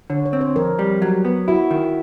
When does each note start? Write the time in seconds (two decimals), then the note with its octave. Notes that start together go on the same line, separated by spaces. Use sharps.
0.10 D3 C#5
0.26 C#5
0.33 C4
0.41 C5
0.56 F2 A#4
0.79 G3
1.02 F#3
1.25 B3
1.48 E4 F#4
1.71 D#3